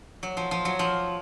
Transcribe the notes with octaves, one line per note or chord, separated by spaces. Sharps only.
F#3
F3
F3
F#3
F3